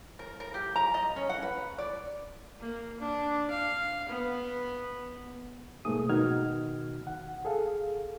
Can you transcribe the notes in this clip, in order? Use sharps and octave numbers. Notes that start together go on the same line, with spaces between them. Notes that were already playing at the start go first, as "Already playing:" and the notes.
A#4
A#4
G4
A#5
D#5
C#4
F#5
B4
D5
A#3
D4
F5
B3
G#2 B2 A3 A#3 G#4 D#6
B2 D#3 D#4 F#4 F6 G#6
F#5
G#4 A4 F5